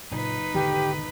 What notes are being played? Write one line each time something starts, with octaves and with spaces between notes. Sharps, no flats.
F#1 A#2 D#4 B4
G#1 E2 B2 D3 G4